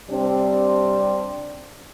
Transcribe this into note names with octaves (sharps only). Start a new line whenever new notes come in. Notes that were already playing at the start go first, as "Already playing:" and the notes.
C3 G3 C4 D4